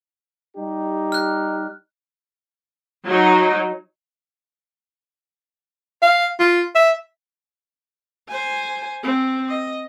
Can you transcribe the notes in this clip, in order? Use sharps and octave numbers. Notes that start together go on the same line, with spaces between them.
G3 D#4 G4
F6 F#6
F#3 D#4
F5
F4
E5
C5 G#5
C4
D#5